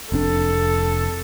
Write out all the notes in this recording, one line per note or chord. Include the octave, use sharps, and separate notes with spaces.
F1 C4 D4 A4